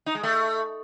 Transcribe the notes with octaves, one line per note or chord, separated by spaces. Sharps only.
D#4
G#3
A3